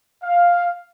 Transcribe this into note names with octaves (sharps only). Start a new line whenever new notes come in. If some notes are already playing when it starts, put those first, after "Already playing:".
F5